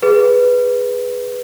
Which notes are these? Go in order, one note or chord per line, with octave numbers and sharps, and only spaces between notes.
G#4 B4